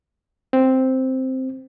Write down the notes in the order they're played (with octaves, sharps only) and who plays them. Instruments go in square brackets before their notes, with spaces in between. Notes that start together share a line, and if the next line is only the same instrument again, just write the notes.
[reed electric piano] C4